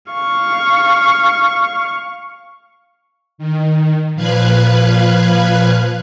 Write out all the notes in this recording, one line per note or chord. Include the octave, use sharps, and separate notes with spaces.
F5 C#6
D#3
A#2 F3 B4 F5 F#6 G#6